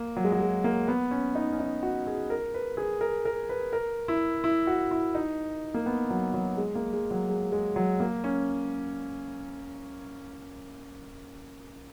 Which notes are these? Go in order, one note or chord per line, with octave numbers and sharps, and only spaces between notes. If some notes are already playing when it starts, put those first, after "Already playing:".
Already playing: A#3
F#3
G#3
F#3
G#3
A#3
B3
C#4
D#4
C#4
D#4
F#4
G#4
A#4
B4
G#4
A#4
A#4
B4
A#4
E4
E4
F#4
E4
D#4
A#3
B3
F#3
F#3
G#3
A#3
G#3
F#3
G#3
G#3
F#3
A#3
C#4